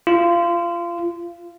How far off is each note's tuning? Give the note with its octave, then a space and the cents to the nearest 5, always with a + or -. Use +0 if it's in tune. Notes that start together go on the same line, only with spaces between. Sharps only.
F4 -25